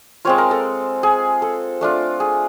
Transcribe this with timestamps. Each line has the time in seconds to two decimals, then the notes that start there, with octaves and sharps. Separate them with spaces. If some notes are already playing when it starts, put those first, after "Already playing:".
0.25 G#3 C4 F4 C#5
0.38 A#4
0.51 A4
1.03 G#4
1.42 A4
1.81 A3 D4 F4
2.20 G#4